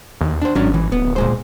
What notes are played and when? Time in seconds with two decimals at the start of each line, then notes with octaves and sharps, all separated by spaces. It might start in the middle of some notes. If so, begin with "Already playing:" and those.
0.21 D#2
0.42 D4 C5
0.55 G#1 F#3 C#4 D4
0.74 E3
0.92 D1 B3
1.16 A#2 G#3 C5